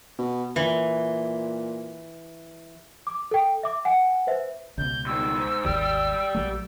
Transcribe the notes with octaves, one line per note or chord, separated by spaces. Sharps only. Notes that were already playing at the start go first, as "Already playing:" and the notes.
B2
A#2 E3
D6
A4 G5
E5 D6
F#5 G#5
B4 C5 E5
C#2 B2 G6
G2 D#3 E6
G#2
G#1 D#2 G4 D5
A#1 F#3 A3